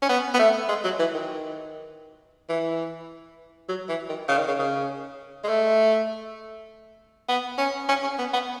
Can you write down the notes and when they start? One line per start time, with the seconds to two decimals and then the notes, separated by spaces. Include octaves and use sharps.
0.02 C#4
0.09 B3
0.34 B3
0.39 A3
0.69 G#3
0.84 F#3
0.99 E3
1.14 D#3
2.49 E3
3.69 F#3
3.89 E3
4.09 D#3
4.29 C#3
4.38 D#3
4.48 C#3
4.59 C#3
5.44 G#3
5.49 A3
7.29 B3
7.58 C#4
7.89 C#4
8.03 C#4
8.19 B3
8.33 B3